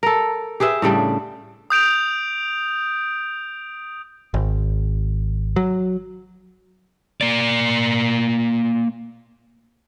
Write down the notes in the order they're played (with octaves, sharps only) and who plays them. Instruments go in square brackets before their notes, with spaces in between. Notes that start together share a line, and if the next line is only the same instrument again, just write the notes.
[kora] A4 A#4
G4 G#4 B4 E5
A2 C#3 G3 D4
[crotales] D#6 G6 D7 F7
[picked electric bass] G#1
F#3
[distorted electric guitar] A#3 D5